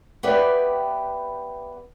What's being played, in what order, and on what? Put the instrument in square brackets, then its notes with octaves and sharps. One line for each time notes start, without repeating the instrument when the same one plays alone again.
[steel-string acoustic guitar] B3 G4 B4 D5 E5 G5